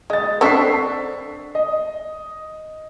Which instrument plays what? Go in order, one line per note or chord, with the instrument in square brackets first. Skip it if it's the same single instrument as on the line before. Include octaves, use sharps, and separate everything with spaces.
[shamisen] G#3 [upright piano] D#5 A6
[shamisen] C4 D4 A4 [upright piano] C#6 B6 C7
[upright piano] D#5